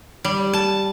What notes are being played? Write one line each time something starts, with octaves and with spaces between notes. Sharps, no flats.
G3
A5